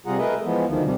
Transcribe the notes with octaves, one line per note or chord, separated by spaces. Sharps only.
C3 G3 F4 G#4 F#5 A#5
A3 G#4 A#4 B4 D#5 E5
E3 F3 G#3 B3
D2 D#3 F3
C3 G3